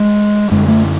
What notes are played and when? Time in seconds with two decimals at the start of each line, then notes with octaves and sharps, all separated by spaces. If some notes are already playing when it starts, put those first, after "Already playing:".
Already playing: G#3
0.51 F#2 D3 G#3
0.68 A3